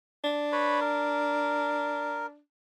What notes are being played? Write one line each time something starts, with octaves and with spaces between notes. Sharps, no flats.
D4
B4 C#5 B5
A#4